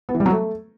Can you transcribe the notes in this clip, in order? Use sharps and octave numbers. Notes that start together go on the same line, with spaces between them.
B3
E3
G3
F#3
A3